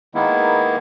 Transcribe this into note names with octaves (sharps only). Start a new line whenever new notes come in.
D#3 G#3 A#3 B3 E4